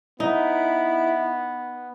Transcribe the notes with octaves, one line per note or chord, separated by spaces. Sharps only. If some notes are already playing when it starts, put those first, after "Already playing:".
B3 D#4 E4